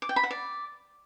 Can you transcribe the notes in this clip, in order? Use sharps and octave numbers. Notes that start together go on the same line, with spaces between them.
D6
G5
B5
F#5
D5